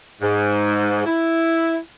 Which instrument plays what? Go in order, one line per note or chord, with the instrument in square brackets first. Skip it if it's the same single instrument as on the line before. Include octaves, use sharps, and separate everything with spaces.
[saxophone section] G#2
E4